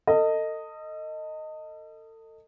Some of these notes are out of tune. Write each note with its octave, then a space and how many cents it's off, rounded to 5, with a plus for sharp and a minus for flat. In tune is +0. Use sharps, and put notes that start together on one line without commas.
A4 +35 D#5 +0